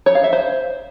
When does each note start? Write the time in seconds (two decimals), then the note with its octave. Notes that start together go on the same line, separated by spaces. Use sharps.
0.06 C#5
0.15 F5
0.24 E5
0.33 C5